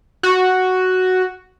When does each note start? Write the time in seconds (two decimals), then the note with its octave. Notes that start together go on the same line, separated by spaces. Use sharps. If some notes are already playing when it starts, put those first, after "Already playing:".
0.23 F#4